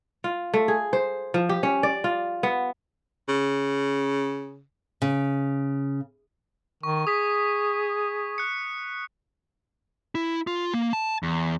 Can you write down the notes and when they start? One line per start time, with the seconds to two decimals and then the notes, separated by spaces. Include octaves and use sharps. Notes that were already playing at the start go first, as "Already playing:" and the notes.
0.24 F4
0.54 A3
0.68 G#4
0.93 C5
1.34 F3
1.49 G4
1.63 C#4
1.83 D5
2.04 F4
2.43 B3
3.28 C#3
5.02 C#3
6.83 D#3 C#6
7.07 G#4 D#6 B6
8.38 F#6 C#7
10.15 E4
10.47 F4
10.74 A#3
10.93 A5
11.23 E2